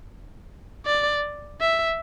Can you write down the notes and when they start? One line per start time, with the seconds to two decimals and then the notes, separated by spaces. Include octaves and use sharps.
0.86 D5
1.60 E5